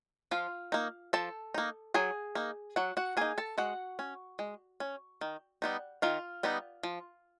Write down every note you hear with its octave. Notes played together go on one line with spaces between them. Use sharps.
F3 F4 F5
A#3 D#4
F3 A4 A5
A#3 D#4
F#3 G#4 G#5
A#3 D#4
F#3 F#4 F#5
F#4 F#5
A#3 D#4 G#4 G#5
A4 A5
G#3 F#4 F#5
C#4
G#3
C#4
D#3
G3 B3 D#4
D#3 F4 F5
G3 B3 D#4
F3